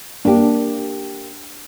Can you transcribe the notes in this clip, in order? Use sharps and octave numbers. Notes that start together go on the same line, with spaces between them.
A#3 D4 G4